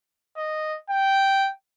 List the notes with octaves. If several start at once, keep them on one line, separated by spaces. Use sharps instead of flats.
D#5
G5